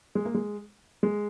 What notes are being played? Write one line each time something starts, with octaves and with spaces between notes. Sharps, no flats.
G#3
A#3
G#3
G#3